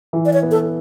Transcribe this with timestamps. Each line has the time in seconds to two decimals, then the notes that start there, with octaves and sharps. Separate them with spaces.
0.13 E3
0.25 D5
0.33 C#5
0.43 B3
0.51 A4